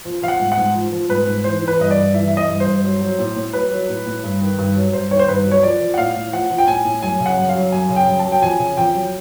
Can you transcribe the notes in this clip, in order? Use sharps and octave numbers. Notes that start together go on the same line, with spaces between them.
F3
F3 F5
F#5
G#2
F#5
G#2
F3
F3
G#2 B4
G#2
E3 C5
E3
B4
G2 D#5
D5
G2
E3 E5
E3 E5
D#5
G2
C5
G2
F#3
F#3
A2
A2
F#3 B4
F#3
A2
A2
G2
D#3
G2
F#3
G2 C5
D#3 C#5
C5
G2 B4
F#3
C#5
F3 D5
F3
F#5
A2 F5
A2
F3 F#5
F3
G5
A2 G#5
A2
F#2 G#5
C#3
F#5
F#2
F5
F#3
F#2 G#5
C#3
G5
F#2
A5
F#3
G5
F2 G#5
C#3
F2 G5
F#3